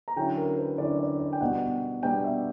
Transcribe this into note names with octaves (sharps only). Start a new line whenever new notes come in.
A#5
D3 F#3 C#4 E4 G5
A#4
B4
D3 F#3 C#4 E4 D5
D5
D5
G5
B2 G3 B3 D4 F#5
B2 G3 B3 D4 G5
E5